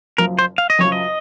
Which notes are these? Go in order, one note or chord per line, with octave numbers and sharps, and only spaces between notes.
F#1 F#2 F3 A#4
C5
F5
D#5
F#1 F#2 F3 C#5
D#5